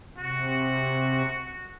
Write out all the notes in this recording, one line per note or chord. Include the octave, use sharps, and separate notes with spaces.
C3 F#4